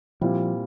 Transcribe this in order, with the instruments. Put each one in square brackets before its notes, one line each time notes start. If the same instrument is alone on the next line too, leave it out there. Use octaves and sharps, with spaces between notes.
[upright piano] A#2 G3 C4 E4 [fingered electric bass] F3